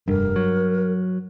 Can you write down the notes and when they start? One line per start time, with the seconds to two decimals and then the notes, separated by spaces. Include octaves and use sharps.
0.08 F1 G2 A#4
0.36 F#3